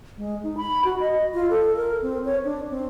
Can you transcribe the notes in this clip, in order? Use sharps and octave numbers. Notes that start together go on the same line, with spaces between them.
G#3
D#4
B5
F#4
D#5
F4
A4
A#4
C4
C#5
D4
C4